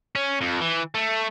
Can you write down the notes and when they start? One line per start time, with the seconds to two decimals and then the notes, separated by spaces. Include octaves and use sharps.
0.15 C#4
0.41 F2
0.61 E3
0.95 A3